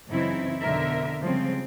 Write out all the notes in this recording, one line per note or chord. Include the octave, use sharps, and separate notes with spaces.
F#2 C#3 E3 C4 D#4 E4
F2 B2 D3 A#4 E5
C#3 F3 G3 G#3 C4